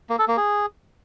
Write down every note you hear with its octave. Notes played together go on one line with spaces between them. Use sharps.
A#3
A4
A#3
G#4